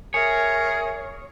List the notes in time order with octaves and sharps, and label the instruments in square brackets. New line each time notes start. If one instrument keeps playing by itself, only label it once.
[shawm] G#4 [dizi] A#4 [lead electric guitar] C#5 [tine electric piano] E5 G#5